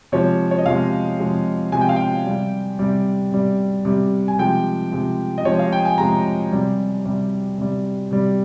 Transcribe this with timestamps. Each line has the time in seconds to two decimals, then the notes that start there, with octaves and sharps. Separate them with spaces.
0.12 C3 F3 G#3 C#5
0.51 C#5
0.59 D#5
0.66 C3 F3 G#3 F5
1.19 C3 F3 G#3
1.72 C3 F3 G#3 G#5
1.81 G5
1.89 F5
1.96 G5
2.26 C3 G3
2.79 C3 G3
3.32 C3 G3
3.85 C3 G3
4.28 G#5
4.39 C3 F3 G#3 G5
4.92 C3 F3 G#3
5.38 D#5
5.45 C3 F3 G#3 C#5
5.59 F5
5.72 G5
5.85 G#5
5.98 C3 F3 G#3 A#5
6.52 C3 G3
7.06 C3 G3
7.58 C3 G3
8.11 C3 G3